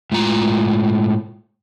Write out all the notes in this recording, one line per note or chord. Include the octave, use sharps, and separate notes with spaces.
A2 G#3 F4 A#5